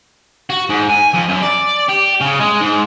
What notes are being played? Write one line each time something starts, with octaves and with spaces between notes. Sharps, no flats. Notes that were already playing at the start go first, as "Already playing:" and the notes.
F#4
G#2
G#5
F2
F#2
D5
G4
C#3
G#3
G#2